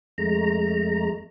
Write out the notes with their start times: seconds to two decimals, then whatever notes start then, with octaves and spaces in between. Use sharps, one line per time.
0.18 F2 G#3 A3 A#5